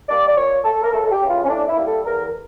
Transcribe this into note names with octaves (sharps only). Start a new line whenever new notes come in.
G3 A#3 D5
D5
A#2 C#5
A3 A4
A#4
C#2 A4
A4
G4
C#3 E3
F4
C#4
A2 D4
E4
G3 A#3
A4
E2 A#4